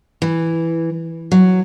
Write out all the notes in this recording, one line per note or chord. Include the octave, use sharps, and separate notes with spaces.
E3
F#3